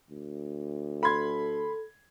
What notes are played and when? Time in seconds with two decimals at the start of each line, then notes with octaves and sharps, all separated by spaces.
0.10 D2
1.03 A4 B5 C6 G#6